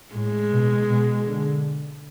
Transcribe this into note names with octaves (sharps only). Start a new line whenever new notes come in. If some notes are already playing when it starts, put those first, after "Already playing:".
A2 G#3
B2
B2
D3